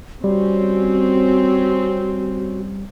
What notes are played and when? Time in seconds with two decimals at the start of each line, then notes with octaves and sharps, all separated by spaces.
0.24 G3 C4 C#4 F#4